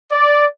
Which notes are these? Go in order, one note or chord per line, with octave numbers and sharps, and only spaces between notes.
D5